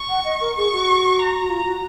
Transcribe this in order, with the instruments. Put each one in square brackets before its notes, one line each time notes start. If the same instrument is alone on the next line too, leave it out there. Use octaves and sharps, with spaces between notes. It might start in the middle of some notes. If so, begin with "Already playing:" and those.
Already playing: [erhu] C#6
[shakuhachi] F#5
D#5
A#4
[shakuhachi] G#4 [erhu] C#6
[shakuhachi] F#4
[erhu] A#5
[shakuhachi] F#4
F4
F#4